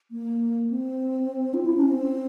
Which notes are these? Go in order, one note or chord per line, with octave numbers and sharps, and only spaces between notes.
A#3
C4
F4
E4
C#4
C4